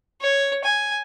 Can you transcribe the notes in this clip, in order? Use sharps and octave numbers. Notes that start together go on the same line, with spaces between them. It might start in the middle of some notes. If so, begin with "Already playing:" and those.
C#5
G#5